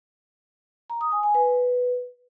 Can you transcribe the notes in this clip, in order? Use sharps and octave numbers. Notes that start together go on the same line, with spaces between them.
A#5
D#6
G#5
G#5
B4